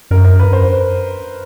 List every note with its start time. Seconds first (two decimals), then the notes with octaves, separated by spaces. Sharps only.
0.11 F#2 A#4
0.25 A#4
0.40 B4
0.53 C5